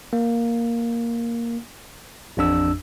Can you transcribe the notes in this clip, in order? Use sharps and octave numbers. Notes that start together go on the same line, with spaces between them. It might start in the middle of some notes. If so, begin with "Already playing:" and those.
A#3
A1 F2 D4 E6